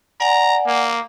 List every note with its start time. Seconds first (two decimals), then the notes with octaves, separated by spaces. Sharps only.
0.20 D5 F#5 G#5 A#5
0.67 A#3